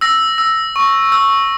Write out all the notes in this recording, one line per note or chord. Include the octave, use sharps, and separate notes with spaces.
E6 A#6
E6
C#6
E6